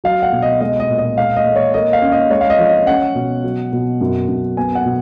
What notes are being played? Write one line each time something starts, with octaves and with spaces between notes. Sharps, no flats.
F#3 F5
F#5
B2
D#5
G#3 D#5
D#5
A#2
D#5
G#3 F5
D#5
G#3
C#5
A#3 D#5
F5
C#4
D#5
G#3 C#5
F5
D#5
F3
D#5
C#4 F#5
B2
F#3
B2
F#2
F#2
B3 G#5
F#5
B2